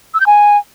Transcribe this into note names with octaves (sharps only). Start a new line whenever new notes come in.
E6
G6
G#5